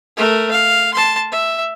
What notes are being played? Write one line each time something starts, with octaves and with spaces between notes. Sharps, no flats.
A3 A#4
F5
A5 C6
E5